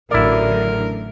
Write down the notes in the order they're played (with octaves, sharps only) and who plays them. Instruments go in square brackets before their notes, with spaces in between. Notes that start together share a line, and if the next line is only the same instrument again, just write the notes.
[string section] A1 D3 F#3 [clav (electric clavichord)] E4 D5 [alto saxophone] A#4